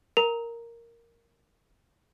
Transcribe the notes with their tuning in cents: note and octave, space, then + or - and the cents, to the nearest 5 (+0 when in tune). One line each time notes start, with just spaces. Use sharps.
A#4 +0 A#5 +0